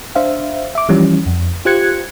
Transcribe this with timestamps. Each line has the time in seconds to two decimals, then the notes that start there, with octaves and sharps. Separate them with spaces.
0.15 D4 C5 E5 F5
0.75 E5 D6
0.89 E3 F3 G3 C#4
1.26 F2
1.65 F4 G4 C5 F#6 G#6 C#7